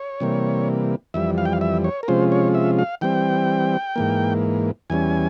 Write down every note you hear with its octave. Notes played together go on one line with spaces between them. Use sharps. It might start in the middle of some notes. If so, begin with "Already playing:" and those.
Already playing: C#5
C3 E3 G3 A#3
F2 E3 G3 E5
F5
G5
F5
E5
C#5
A#4
C3 F3 G#3 C#4 F4 C5
C#5
E5
F5
E3 G3 C4 G5
G#2 E3 A#3
E2 E3 G3 C#4 G#5